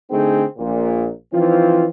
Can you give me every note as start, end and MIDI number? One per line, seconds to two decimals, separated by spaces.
0.11 0.44 50
0.11 0.44 57
0.11 0.44 60
0.11 0.44 63
0.11 0.44 68
0.58 1.06 34
0.58 1.06 46
1.32 1.84 52
1.32 1.84 53
1.32 1.84 60
1.32 1.84 63
1.32 1.84 65